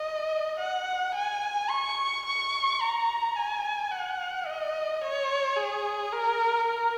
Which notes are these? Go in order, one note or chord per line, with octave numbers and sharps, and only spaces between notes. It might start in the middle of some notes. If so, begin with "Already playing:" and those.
Already playing: D#5
F#5
G#5
C#6
C#6
A#5
G#5
F#5
D#5
C#5
G#4
A#4
A#4